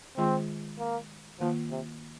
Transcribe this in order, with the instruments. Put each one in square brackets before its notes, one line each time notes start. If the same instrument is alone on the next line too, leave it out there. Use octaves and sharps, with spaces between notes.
[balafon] D#3 G#3 F4 G#4 C5 [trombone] C4
[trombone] A#3
[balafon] D#3 A#3 F4 [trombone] F3
[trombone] C3